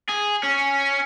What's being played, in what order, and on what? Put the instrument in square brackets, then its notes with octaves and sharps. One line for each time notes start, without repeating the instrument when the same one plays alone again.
[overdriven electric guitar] G#4
C#4